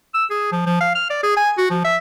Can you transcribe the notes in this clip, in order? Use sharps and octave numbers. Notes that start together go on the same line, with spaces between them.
E6
G#4
F3
F3
F5
F6
D5
G#4
G#5
F#4
F3
E5